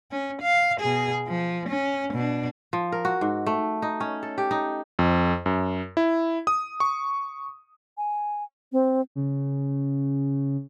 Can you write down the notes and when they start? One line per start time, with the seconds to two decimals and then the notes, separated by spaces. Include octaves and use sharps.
0.11 C#4
0.42 F5
0.81 B2 G#4
1.27 F3
1.69 C#4
2.14 B2 D4
2.73 F3
2.92 A#4
3.05 F#4
3.21 G#2
3.47 A3
3.82 D#4
4.00 C#4
4.23 A4
4.38 G4
4.51 D#4
4.99 F2
5.46 F#2
5.97 E4
6.47 D#6
6.80 C#6
7.98 G#5
8.72 C4
9.16 C#3